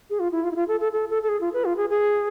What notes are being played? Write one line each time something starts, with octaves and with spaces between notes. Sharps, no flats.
G#4
F4
E4
F4
E4
F4
A4
A4
A4
A4
A4
G#4
F4
B4
F4
G#4
G#4